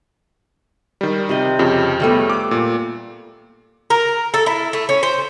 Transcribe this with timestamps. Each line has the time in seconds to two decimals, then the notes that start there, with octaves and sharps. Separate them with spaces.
1.01 D#3 G3
1.29 C3 D#5
1.59 F2 C#3 G4
2.00 G3 A3 B3
2.30 D6
2.51 A#2
3.90 A#4
4.34 A4
4.46 E4
4.73 A3
4.89 C#4
5.03 C5